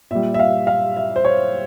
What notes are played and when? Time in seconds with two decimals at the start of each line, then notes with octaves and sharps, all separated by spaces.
0.11 A#2 G3 E5
0.34 E5
0.39 F5
0.67 F5
0.97 E5
1.16 C5
1.25 C#5